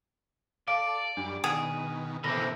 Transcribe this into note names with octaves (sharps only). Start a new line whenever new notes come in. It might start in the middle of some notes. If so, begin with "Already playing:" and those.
A4 D5 F5 D6 D7
F#2 G3 D4
B2 D#3 G#4
B2 D3 E3 A#3 C4 B5 A#6